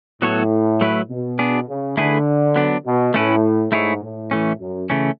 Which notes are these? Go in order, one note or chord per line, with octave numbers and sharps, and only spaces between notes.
A2 F#3 B3 F#4 A4 C#5
F#3 A3 E4 B4
B2
B3 D4 G#4
C#3
D3 A3 E4 G#4 B4
F#3 B3 D4
B2
A2 A3 C#4 E4 B4
G#2 A3 E4 G#4 C#5
A2
E3 A3 C#4
F#2
C#3 E3 A3 C#4